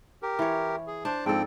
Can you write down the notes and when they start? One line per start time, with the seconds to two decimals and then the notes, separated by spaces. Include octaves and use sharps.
0.22 G4 A#4
0.39 E3 C#5
0.87 G#4
1.05 D4 C5 A5
1.26 G#2 F3 C4 A4 G5